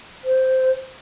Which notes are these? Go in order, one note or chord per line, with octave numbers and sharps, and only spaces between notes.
C5